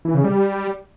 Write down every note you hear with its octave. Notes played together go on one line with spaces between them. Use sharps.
E3
C#3
G3